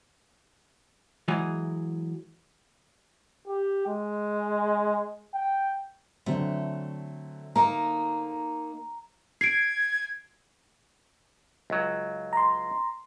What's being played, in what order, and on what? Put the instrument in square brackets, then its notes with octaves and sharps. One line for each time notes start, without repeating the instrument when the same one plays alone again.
[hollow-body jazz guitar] E3 F#3 G#3 G#4
[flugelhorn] G4
G#3
G5
[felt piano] D3 F#3 C4 [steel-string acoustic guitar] A3
[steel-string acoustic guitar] A#3 D#4 [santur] A#5
[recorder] G#6 [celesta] C7 D7
[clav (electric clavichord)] C#2 F#3
[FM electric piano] A#5 C6